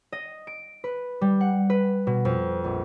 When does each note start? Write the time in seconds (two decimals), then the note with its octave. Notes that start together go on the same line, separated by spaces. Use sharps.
0.12 D#5
0.47 D7
0.84 B4
1.21 G3
1.41 F#5
1.70 B4
2.07 B2
2.25 F2
2.64 A#1